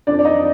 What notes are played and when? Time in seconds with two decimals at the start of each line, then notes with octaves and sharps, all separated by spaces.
0.07 F2 D4 D5
0.19 D5
0.25 D#4 D#5